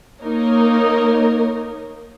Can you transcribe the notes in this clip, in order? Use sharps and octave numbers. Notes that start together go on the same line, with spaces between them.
A#3 D#4 A#4 C#5